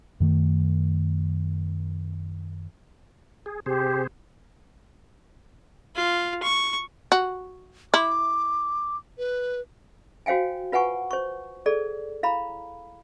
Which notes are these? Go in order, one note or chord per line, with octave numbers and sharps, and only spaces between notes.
F#2 D#3 A3
G#4
C3 G4 G#4 C5
F4
C#6
F#4
E4 D6
B4
F#4 C5 F5 G5 G#5
F4 B4 F#5 G#5 C#6
C5 C#6
G#4 A4 D5
E4 F5 A#5 B5